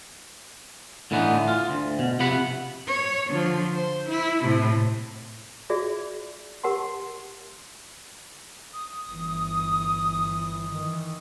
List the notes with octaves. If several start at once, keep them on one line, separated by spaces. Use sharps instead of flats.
A2 D3 E3 B3 D#4
F4
D2
B2
C3 F3 B3 F#5 B5
C#5
D3 F3
C5
E4
A2 C3
F4 F#4 G#4 D5 E5
G4 A#4 F#5 A5 C6
D#6
G1 E3
D#3 E3